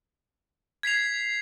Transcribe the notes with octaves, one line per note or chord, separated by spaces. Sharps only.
G#6 B6 C7 F7